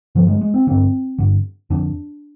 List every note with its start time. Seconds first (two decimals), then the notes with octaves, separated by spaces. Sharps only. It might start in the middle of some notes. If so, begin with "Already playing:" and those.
0.15 G2 D3 F3
0.28 G#3
0.41 G#3
0.54 C4
0.67 G2 D3 C4
1.18 G2 D3
1.70 F2 D3 D4